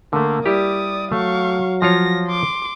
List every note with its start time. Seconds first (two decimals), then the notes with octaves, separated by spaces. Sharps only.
0.13 D3 A3 A#3
0.46 G3 E4 G4 D5 D#6
1.12 F#3 A3 F5 C#6
1.82 F3 F4 C#5 A#6
2.28 C6 D6